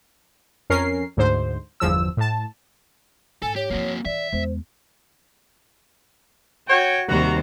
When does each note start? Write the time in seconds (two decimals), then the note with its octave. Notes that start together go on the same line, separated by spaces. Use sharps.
0.70 F2 C#4 A#4 C7
1.17 D2 G#2 C5
1.80 G1 E2 F3 E6
2.17 A2 A5
3.42 G#2 A4 G#5
3.56 G4 C#5
3.70 F3 A#3 C4 F#4
4.05 E3 D5 E5
4.33 E2 G#3 C5
6.68 F#4 C#5 G5
7.09 D#2 C3 G3 F#4 C5 A#5